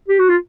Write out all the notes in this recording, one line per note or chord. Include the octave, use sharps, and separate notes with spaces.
G4
F#4
F4